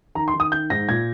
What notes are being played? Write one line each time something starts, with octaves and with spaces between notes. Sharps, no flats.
D#3 A#5
C6
D#3
D#6
D#3 G6
G#2 A#6
A#2 G#6